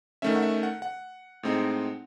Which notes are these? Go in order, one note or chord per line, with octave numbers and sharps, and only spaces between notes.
D#3 A3 C#4 E5
F#5
E5
F#5
F#5
A2 G#3 C4 D#4